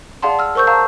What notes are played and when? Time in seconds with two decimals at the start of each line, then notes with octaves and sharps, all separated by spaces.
0.22 G#4 D5 F5 F#5 A5 C6
0.39 E6 F6
0.55 A#4 C5 C#6 E6 G6
0.67 F5 A5 A#5 E6